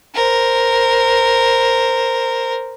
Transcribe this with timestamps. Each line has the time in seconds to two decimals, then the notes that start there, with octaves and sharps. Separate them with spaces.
0.15 A#4 C5